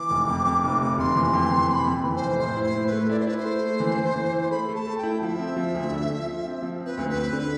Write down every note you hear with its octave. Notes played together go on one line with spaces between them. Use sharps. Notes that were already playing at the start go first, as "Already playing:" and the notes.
Already playing: E3 D6
F1
F2
F2
F1
C3
F1 C6
E3
F2
E3
C3 B5 C6
F2
E3
C5
F1
A2 C5
E4
C5
A2
B4
A3
E4 D5
C5
E4 B4
C5
A3
A3
E3
E3
E3
E4
A3 B5
A3
A5
A3
G5
E4
F3 E5 G5
C4
F3
D2
D3
F3
F3
C4
F3
C4
B4
D2
B4
C4
D3